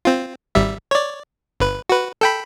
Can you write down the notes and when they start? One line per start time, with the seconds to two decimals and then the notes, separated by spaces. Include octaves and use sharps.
0.05 C4 F4
0.55 G#1 G3 E5
0.91 C#5 D5
1.60 G1 B4
1.89 F#4 B4
2.21 A4 G5 B5